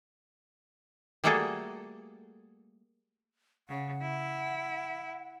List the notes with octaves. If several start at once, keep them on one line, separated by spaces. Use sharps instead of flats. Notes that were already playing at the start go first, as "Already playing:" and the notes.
G3 A3 A#3 F#4 G#4 A4
C#3 F#5
E4